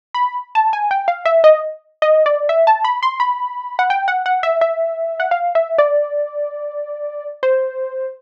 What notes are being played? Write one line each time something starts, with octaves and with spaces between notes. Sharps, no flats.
B5
A5
G#5
G5
F5
E5
D#5
D#5
D5
E5
A5
B5
C6
B5
F#5
G5
F#5
F#5
E5
E5
F#5
F5
E5
D5
C5